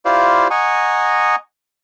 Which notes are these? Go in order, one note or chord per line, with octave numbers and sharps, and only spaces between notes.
E4 F4 G4 C5 D5 F5
D#5 F#5 G#5 A#5 C#6 D#6